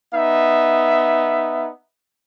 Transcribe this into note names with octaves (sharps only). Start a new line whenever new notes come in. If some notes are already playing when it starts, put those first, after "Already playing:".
B3 D#4 E5